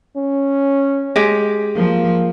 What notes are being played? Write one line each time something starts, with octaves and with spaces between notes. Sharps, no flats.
C#4
G#3 G4
F3 A#3